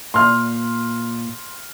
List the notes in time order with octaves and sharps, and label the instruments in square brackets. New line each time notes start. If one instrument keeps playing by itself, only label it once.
[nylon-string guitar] A#2 [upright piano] C6 F6